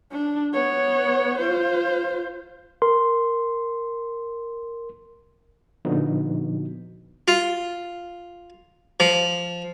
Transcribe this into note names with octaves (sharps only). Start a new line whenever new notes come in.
D4
B3 C#5
F4 C5
A#4 C6
A#2 D3 F3 B3 D#4 F#4
F4
F3